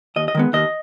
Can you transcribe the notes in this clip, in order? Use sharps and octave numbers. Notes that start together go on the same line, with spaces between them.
D#2 D#5
D#5
D#3 G#3 B3
D#2 D#5